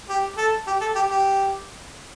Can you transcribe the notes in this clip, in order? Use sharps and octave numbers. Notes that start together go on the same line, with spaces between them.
G4
A4
G4
A4
G4
G4